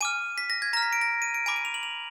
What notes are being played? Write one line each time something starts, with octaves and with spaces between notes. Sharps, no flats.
G#5 D6 F6 D#7
B6
A#6
G#6
A#5 F6 A#6
B6
D7
A#6
D#7
D7
G#5 B5 D6 D7
D#7
F7
F#7
F7